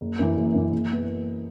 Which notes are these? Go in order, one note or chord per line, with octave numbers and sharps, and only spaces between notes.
F#1
F#2 E3
F#1
F#2 E3
F#1
E3 B3